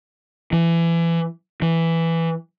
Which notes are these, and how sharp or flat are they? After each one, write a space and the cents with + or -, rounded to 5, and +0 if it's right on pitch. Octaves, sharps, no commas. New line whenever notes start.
E3 +25
E3 +5